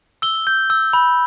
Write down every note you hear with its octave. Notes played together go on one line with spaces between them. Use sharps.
E6 G7
G6
E6
B5